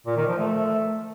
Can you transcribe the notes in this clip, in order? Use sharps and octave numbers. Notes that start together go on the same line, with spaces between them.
A#2
D#3
F3
A3